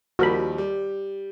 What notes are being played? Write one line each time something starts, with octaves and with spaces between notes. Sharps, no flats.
D#2 F3 G3 F#4 A#4 B5
G3